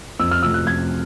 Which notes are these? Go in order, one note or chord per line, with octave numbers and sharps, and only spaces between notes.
F2 E6
F6
C3 F3 A3 E6
F#6
F2 G#6